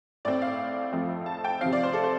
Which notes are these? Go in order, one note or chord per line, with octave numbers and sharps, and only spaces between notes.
A2 A3 C4 D5
F5
F2 F3 A3 C4
A5
G5
C3 F3 C4 F5
D5
C5
A4
C5